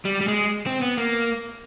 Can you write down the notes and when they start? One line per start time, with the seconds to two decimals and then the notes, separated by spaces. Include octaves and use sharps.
0.05 G3
0.21 G3
0.28 G#3
0.66 C4
0.82 B3
0.97 A#3